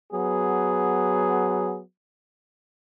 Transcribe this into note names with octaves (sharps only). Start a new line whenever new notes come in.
F#3 B3 G#4